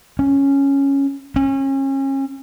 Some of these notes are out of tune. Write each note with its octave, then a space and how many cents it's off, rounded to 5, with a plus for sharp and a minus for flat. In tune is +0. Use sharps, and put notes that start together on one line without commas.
C#4 +0
C#4 -30